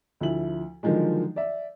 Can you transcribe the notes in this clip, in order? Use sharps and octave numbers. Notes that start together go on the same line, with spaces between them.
D2 F3 E4 F#7
D3 D#3 F3 F#3 G#3
D5 E5